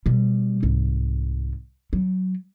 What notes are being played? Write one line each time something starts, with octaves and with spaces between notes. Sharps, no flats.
B2 G3
C2 G#2
F#3